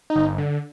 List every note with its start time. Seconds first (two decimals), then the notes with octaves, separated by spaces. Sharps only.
0.10 D#4
0.15 G1
0.38 D3